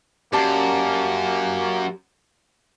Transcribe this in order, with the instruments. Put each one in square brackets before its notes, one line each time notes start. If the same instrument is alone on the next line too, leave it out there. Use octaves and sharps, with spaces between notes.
[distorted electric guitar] F#2 [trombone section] A#3 [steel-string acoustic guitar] G4 D5 A5